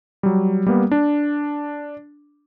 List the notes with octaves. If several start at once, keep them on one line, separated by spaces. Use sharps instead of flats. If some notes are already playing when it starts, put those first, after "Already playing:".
F#3 G3
G3 A#3 B3
D4